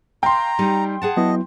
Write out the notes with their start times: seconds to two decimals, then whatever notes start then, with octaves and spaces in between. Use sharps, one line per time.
0.23 F5 G5 A#5 C6
0.59 G3 D#4
1.02 G#4 F#5 A5
1.17 F#3 B3 E4 D#5